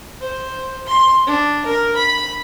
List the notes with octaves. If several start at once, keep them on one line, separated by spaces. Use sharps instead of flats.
C5
C6
D4
A#4
B5